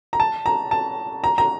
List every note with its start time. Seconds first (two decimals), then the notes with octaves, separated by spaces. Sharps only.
0.13 A#5
0.20 A5
0.46 A#5
0.71 A5
1.24 A#5
1.38 A#5